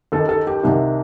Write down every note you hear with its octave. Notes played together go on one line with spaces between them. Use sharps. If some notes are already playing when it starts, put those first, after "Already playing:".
D#2 D#3 A4
A4
G4
C2 C3 D#3